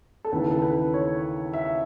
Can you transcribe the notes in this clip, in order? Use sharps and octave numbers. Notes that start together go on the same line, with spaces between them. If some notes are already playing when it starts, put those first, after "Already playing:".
A4
D#2 C#3 E3 B4
A4
B4
C#5
E5